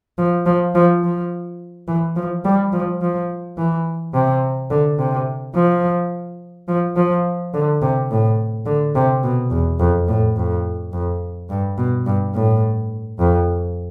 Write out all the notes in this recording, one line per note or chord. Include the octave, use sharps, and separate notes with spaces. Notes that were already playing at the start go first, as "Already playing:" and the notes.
F3
F3
F3
F3
E3
F3
G3
F3
F3
E3
C3
D3
C3
F3
F3
F3
D3
C3
A2
D3
C3
B2
E2
F2
A2
F2
F2
G2
B2
G2
A2
F2